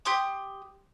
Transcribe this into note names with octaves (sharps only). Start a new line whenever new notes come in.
G4 C6 D#6